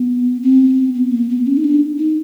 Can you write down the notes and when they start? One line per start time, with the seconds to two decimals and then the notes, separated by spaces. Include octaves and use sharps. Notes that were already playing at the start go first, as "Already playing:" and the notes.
Already playing: B3
0.43 C4
0.94 B3
1.11 A#3
1.30 B3
1.47 C#4
1.57 D#4
1.64 D4
1.98 D#4